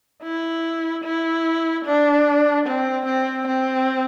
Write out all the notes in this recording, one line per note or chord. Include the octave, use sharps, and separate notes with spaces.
E4
E4
D4
C4
C4
C4